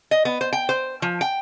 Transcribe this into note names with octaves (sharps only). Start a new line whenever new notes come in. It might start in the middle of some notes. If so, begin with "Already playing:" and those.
D#5
B3
C5
G5
C5
F3
G5